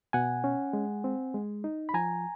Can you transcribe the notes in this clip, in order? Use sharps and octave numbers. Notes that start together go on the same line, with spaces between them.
B2 F#5 G#5
C#4
G#3
C4
G#3
D#4
B5
F3 G#5 A#5